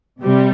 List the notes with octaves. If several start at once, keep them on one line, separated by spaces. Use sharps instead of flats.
C3 G3